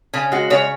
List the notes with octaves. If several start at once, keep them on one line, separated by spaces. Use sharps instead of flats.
C#3 C#4
G#3 F#4
C#3 C#5